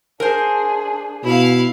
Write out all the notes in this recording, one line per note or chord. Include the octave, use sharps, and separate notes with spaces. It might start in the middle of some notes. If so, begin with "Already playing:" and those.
D4 G#4 A#4 C5
B2 E4 F5